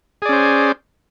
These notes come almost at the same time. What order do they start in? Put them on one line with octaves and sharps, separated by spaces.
G#4 D5 C#4 C5